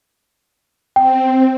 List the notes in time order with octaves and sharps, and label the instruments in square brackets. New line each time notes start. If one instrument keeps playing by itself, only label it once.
[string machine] C4 [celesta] G5